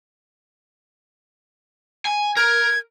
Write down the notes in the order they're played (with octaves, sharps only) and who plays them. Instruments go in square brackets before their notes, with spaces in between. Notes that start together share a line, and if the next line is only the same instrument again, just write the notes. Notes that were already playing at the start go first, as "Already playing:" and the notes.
[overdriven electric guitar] G#5
[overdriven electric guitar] A#4 [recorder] G#6